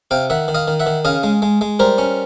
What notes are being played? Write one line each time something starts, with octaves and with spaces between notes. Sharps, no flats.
C3 F5 G5
D#3 E5 F#5
D#3
D#5 F5
D#3
E5 F#5
D#3
C#3 D#5 F5
G#3
G#3
G#3
G3 A#4 C5
C#4